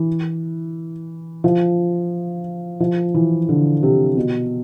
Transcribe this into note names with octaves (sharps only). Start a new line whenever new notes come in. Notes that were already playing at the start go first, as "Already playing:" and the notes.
Already playing: E3
F3
F3
E3
D3
C3
B2